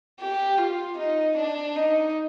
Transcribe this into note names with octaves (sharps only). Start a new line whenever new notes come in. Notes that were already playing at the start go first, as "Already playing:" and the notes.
G4
F4
D#4
D4
D#4